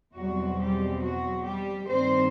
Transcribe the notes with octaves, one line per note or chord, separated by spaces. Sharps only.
E2 B2 F#3 G3 C4 F#4
G3 G4
F#3 F#4
G3 G4
G2 D#3 G3 A#3 C4 D4 C5